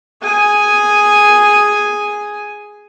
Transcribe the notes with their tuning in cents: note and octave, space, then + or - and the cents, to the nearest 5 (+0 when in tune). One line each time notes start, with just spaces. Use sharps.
G#4 +0 G#5 +0